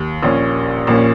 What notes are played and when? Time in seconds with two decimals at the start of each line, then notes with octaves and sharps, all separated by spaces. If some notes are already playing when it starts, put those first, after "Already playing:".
Already playing: D#2
0.23 A#1 A#2 A#3 C#4
0.87 A#1 A#2 A#3 C#4